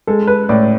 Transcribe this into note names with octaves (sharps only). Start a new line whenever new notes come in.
G#3 A4
B4
A2 D5